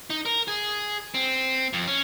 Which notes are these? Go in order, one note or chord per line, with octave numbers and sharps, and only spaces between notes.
D#4
A#4
G#4
C4
F2
C#4